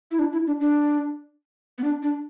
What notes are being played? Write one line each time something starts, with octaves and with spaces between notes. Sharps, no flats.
E4
D4
E4
D4
D4
B3
D4
D4